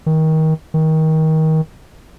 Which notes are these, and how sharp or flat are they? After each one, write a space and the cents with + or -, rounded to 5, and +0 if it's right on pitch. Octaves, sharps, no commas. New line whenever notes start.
D#3 +25
D#3 +25